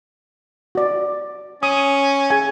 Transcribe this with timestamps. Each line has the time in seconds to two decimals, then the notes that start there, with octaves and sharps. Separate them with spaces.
0.75 F#4 D5
1.63 C#4 D#6
2.30 G#4 G#5